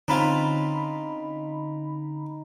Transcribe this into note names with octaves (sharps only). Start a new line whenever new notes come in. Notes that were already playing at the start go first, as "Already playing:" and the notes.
D3 C4 C#4 D#4 F4 B5